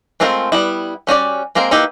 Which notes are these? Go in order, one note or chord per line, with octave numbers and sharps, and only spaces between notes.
G#3 A3 C4 F4 A#4
G3 B3 E4
G3 C#4 F#4 D5
G#3 A#3 C4 A#4
A#3 D#4 E4 G4 B4